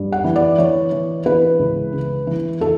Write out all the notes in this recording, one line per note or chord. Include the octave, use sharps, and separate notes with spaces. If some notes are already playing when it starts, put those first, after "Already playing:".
Already playing: G2
F#5
E3
D5
E3 C#5
E3
E3 B4
C#2
C#3
E3
E3 A4